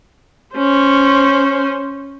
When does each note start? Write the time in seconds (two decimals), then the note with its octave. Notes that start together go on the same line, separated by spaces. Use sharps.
0.56 C#4 C5